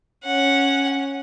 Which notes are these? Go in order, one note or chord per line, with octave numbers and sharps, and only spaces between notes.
C#4 F#5